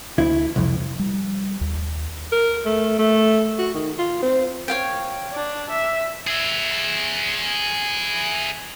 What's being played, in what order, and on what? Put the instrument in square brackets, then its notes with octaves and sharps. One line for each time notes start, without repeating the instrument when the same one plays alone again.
[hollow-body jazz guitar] D2 E4
C2 F2
[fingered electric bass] G3
D#2
[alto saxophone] A#4
A3
A3
F#4
D#3
F4
C4
[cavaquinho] C#5 F5 G5
[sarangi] D4
E5
[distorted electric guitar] G#4 E5